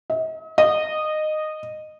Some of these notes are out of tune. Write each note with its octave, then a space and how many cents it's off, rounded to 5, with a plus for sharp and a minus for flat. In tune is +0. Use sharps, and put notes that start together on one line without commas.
D#5 +45
D#5 -15